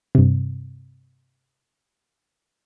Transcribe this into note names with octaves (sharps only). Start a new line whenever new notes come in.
G2 C3